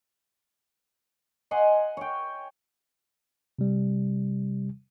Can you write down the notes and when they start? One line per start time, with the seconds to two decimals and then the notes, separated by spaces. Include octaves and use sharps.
1.51 D#5 F#5 G#5 C6
1.97 C#5 G5
3.59 C3 G3